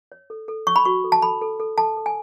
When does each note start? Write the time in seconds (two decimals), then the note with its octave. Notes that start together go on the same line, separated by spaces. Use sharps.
0.12 C#5
0.30 A4
0.48 A4
0.67 C#5 C#6
0.76 B5
0.85 F#4 C#6
1.04 A4
1.12 A5
1.22 A4 B5
1.42 A4
1.60 A4
1.78 A4 A5
1.97 A4
2.06 G#5